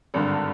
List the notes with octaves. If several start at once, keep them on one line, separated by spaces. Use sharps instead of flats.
G#1 G2 D3